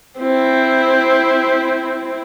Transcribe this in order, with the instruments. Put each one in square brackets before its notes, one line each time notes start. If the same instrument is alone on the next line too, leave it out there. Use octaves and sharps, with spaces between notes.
[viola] C4 E4